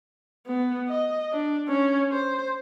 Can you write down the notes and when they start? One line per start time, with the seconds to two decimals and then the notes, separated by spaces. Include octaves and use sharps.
0.47 B3
0.88 D#5
1.33 D4
1.68 C#4
2.12 C5